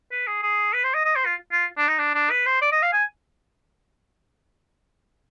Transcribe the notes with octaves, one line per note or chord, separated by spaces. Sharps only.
B4
G#4
G#4
B4
C5
D#5
D#5
C5
F4
F4
D4
D#4
D4
D4
B4
C5
D5
D#5
F5
G#5